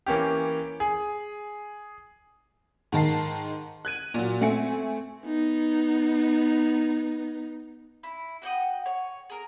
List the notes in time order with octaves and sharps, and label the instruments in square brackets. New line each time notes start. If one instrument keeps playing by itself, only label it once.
[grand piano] E3 A#3 C#4 G4
G#4
[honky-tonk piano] G#2 D#3 A5 C7
F#6 G#6 D#7
A#2 F#3
A3 C4 E5 G#5 C#7
[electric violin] B3 D#4
[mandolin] E4
F#4 F#5 G5 D#6
C#5
G#4 A#4